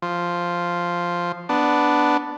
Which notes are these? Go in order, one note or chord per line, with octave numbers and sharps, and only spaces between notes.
F3
B3 D4